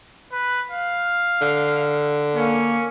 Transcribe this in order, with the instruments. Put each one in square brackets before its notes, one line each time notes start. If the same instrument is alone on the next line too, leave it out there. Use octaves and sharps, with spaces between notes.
[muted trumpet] B4
F5
[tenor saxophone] D3
[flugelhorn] A#3 [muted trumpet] C#4